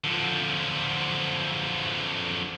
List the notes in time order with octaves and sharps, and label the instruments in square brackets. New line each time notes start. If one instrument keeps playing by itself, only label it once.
[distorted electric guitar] D3 F3